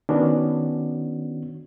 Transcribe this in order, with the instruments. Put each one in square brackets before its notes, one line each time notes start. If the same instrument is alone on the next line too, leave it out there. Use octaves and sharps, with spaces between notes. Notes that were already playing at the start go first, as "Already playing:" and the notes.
[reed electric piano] D#3 B3 C#4 D4 F#4